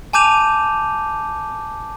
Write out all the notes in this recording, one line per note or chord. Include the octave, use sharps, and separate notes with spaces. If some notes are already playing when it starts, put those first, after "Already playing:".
G#5 A5 D6 G6 D#7 F7